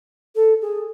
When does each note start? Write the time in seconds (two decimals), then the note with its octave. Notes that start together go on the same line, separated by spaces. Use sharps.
0.36 A4
0.62 G#4